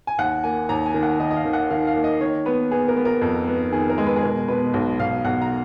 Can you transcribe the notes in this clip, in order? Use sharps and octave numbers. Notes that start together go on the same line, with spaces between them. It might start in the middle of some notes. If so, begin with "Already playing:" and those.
G#5
D#2 F#5
A#3 G#5
D#2 A#5
G#5
D#3
F#5
D#3 D#5
D#5
F5
D#3
F#5
D#3 F5
F5
A#3
D#5
D#3 C#5
B3 B4
B3 G#4
A#4
B3
A#4
F2
B3
D#3 G#4
A#4
G#3
B4
G#4
B2 A#4
B2 B4
B1
B1 F5
B1 F#5
A#5